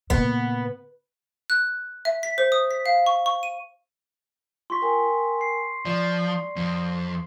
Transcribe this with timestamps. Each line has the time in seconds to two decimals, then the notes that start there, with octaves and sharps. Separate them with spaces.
0.10 A#2 C#3 B3
1.50 F#6
2.05 E5
2.23 B6
2.38 C5
2.52 D#6
2.71 B6
2.86 F5
3.06 C#6
3.26 C#6
3.43 D#7
4.70 F4 C6 C#6 B6
4.82 A#4 G5 G#5
5.41 C7
5.85 F3 D5
6.56 F2